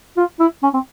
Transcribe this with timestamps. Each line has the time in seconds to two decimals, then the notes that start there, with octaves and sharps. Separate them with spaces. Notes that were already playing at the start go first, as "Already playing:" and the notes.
0.17 F4
0.40 E4
0.63 C#4
0.74 C4